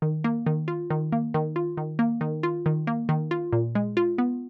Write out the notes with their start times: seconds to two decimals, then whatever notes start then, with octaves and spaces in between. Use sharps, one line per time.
0.02 D#3
0.24 A#3
0.46 D#3
0.68 F4
0.90 D#3
1.12 A#3
1.34 D#3
1.56 F4
1.77 D#3
1.99 A#3
2.21 D#3
2.43 F4
2.66 D#3
2.87 A#3
3.09 D#3
3.31 F4
3.53 A#2
3.75 G#3
3.97 F4
4.18 B3